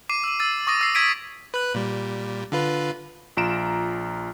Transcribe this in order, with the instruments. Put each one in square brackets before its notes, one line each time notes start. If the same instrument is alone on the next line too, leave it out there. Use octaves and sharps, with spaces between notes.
[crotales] D6 C7 D#7
E6 D#7
E6 A6 D#7
C#6 D#6 A#6 D#7
E6 C7
D6 E6 G#6 B6 D7 D#7
[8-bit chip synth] B4 F#6
A#2 G3
D3 F4 B4
[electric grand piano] A#1 F4 A#5 D7 E7